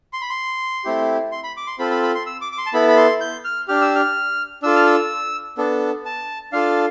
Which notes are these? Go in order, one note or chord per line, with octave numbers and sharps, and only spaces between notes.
C6
B5
C6
A3 C4 E4 G4
C6
B5
D6
C6
C4 F4 A4 B5
B5
B5
C6
E6
D6
D6
C6
A5
B3 E4 A4 B5
B5
C6
G6
F6
D4 G4 F6
E6
F6
D4 F4 A4 E6
F6
E6
B3 D4 A4
A5
D4 F4 A4 F5